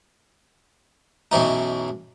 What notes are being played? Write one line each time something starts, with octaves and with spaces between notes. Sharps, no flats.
B1 F#2 E3 D#4